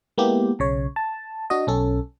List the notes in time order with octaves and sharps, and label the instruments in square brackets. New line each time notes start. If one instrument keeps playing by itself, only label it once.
[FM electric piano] G#3 A#3 B3 E4 G4
B1 C#3 C#5
A5
D4 F#4 D#5
B1 C#4 A4